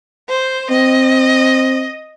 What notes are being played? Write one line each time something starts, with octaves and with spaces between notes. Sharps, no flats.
C5
C4 D#5